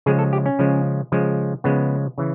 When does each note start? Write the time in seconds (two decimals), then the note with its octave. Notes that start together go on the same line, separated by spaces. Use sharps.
0.06 C#3 F3 G#3 G#4
0.19 A4
0.33 G4
0.46 C#4
0.59 C#3 F3 G#3
1.12 C#3 F3 G#3
1.64 C#3 F3 G#3 B3
2.18 C#3 E3